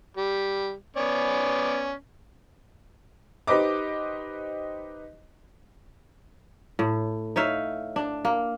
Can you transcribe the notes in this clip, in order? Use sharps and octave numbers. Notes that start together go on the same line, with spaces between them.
G3
B3 C#4 D5
D#4 G4 B4 C5 D#5 D6
A2
D#4 C#5 E5 F5
D4
A#3